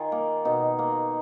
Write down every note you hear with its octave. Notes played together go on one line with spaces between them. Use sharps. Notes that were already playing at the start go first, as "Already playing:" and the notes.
Already playing: D#3 F4 G#4
A#3
B2 D#4
A#3